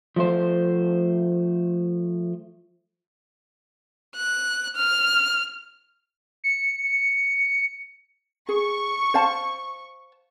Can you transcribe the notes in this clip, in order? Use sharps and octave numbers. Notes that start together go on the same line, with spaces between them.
F3 A3 C5
F#6
F6
C#7
G#4 C#6
C5 F5 A5